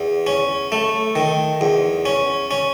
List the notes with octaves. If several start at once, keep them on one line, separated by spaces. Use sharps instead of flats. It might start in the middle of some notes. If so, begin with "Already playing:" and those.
Already playing: E2
C#4
A3
D#3
E2
C#4
C#4